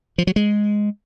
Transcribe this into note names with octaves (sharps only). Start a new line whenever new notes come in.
F3
F#3
G#3